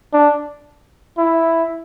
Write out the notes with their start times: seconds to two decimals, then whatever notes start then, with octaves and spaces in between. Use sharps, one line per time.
0.13 D4
1.18 E4